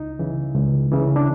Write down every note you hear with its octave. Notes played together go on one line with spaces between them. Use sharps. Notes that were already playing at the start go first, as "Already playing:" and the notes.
Already playing: C#2 D#4
C#3 E3
C#2
C#3 E3
D4